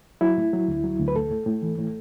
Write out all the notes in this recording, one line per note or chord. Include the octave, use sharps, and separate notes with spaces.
F#3 E4
A2
F#3
D2
F#3
D2
B4
A2 A4
A2
A2
E3
A2